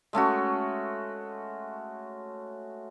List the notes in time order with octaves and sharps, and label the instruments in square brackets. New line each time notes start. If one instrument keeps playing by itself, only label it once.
[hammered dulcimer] G#3 A3 C#4 F#4